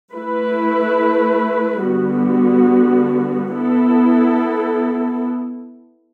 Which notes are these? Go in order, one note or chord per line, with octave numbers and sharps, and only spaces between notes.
A3 E4 B4
D3 G3 B3 F#4
B3 E4 A4